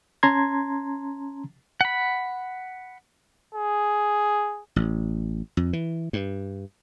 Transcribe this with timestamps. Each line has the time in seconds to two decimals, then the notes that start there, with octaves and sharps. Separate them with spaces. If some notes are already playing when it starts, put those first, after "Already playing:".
0.23 C#4 A5 A#5 C6 G#6
1.81 F#5 B5
3.54 G#4
4.76 A1
5.57 F2
5.73 E3
6.13 G2